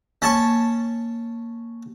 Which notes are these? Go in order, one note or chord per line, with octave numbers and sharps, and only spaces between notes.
A#3 C#4 A5 C#6